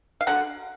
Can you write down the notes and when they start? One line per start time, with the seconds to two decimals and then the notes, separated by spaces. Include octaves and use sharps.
0.21 F5
0.27 D3 F#3 F#5